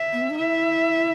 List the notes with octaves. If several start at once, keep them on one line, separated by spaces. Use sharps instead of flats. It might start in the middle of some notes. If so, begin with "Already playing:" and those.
Already playing: E5
B3
C4
D#4
E4 E5